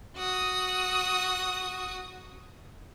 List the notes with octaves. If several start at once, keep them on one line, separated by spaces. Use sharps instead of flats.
F#4 D#6